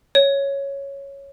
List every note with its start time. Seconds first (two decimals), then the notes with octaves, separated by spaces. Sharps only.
0.15 C#5